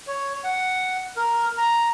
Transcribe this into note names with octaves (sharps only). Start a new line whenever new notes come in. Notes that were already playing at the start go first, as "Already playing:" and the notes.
C#5
F#5
A#4
A#5